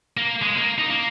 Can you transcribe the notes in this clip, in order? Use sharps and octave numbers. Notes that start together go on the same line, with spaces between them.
A#3
G#3
A#3
D#4
A#3